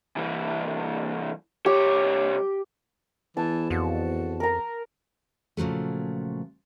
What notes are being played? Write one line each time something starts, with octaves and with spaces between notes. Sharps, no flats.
C2 E3
C2 G4 C#5
E2 E3 A5
F2 F#4
A#4 A#5
A#2 C#3 F3 F#3 A3